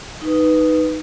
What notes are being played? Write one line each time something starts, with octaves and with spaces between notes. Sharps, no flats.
D#4 B4